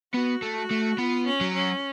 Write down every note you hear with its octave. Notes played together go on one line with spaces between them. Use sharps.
B3 F#4
A3
F#4
A3
B3 F4
C#4
F#3
C#4